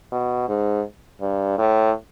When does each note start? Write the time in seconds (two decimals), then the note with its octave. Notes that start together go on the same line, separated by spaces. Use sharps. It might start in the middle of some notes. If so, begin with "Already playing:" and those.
0.12 B2
0.48 G#2
1.21 G2
1.58 A2